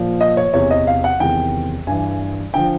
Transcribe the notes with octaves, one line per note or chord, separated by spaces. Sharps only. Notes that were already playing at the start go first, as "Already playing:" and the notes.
Already playing: A#2 F3
D#5
C#5
E2 C3 E3 C#5
D#5
F5
F#5
E2 C3 D#3 G5
G2 E3 G#5
D3 F3 G5